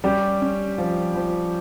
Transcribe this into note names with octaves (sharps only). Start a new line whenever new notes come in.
G3 C#4 G4
C#4
F3
F3